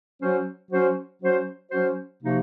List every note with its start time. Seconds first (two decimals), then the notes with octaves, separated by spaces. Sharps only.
0.20 F#3 C#4 F#4 C5
0.70 F#3 C#4 F#4 C5
1.21 F#3 C#4 F#4 C5
1.71 F#3 C#4 F#4 C5
2.22 C3 F3 A#3 D#4 F#4